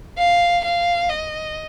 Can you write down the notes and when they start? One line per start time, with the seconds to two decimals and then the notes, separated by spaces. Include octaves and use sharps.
0.18 F5
0.65 F5
1.10 D#5